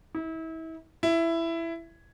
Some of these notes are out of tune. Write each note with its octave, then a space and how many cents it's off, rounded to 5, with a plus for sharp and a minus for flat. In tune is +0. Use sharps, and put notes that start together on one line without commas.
E4 -35
E4 +10